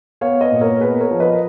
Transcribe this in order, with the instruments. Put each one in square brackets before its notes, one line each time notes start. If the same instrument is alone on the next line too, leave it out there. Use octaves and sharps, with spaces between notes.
[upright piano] B3 C#5 F5
B4 D#5
A#2
A#4 C#5
B3 G#4 B4
A#4 C#5
F3
B4 D#5